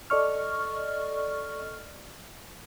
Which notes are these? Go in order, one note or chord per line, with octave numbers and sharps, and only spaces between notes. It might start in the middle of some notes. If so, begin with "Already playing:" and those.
A4 D5 D#5 C#6 F6